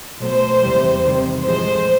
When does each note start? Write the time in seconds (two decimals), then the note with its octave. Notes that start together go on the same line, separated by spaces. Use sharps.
0.20 B2 F#3 A3 C5
0.62 E2 C3 E3 G3
1.03 C3 D#3 G3
1.44 A2 F3 G#3 C5